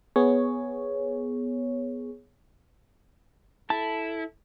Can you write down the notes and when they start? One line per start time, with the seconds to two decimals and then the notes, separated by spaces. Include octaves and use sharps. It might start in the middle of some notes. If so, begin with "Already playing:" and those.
0.16 B3 G#4 C#5
3.70 E4 A4 A5